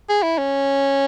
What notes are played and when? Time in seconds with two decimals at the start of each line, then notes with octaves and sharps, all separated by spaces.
0.09 G#4
0.23 E4
0.38 C#4